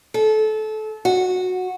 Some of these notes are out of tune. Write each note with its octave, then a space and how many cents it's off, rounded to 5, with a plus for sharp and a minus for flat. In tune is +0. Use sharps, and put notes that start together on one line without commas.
A4 -25
F#4 -10